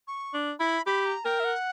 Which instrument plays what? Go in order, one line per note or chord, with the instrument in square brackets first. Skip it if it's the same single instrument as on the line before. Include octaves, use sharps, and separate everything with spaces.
[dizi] C#6
[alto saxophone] D4
[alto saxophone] E4 [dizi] B5
[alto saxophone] G4 [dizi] B5
[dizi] A#5
[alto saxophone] A#4 [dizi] G5
[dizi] E5
F#5